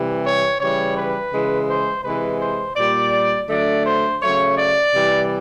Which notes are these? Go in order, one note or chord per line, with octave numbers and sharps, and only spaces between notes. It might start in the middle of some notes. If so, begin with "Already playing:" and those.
Already playing: C3 E3 G3
C#5
C#3 E3 G3 C#5
B4
C#3 E3 G#3
C5
C3 E3 G#3 B4
C5
A#2 G3 D5
D3 F#3 A3 D5
C5
C#3 F#3 A3 C#5
D5
C3 E3 G3